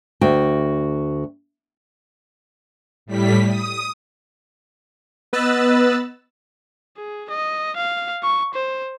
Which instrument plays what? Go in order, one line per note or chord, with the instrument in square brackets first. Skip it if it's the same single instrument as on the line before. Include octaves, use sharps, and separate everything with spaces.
[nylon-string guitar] D2 F#4 G5
[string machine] A2 G3 B6
D#6
[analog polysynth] B3 B4 D#5 E6 F#6 A6
[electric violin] G#4
D#5
F5
C#6
C5